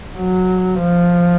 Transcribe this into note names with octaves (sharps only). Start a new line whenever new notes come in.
F#3
F3